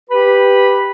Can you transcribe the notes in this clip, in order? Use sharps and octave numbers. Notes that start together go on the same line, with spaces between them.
G4 B4 B5